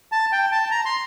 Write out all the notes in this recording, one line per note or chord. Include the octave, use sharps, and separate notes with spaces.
A5
G5
A5
A#5
C6